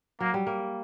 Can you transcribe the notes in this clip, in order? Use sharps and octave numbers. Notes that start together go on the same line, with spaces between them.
F#3 A#3
G3
A#3